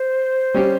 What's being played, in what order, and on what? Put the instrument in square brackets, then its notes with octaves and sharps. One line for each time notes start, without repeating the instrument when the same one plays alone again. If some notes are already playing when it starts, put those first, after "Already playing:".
Already playing: [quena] C5
[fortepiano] G3 C#4 G4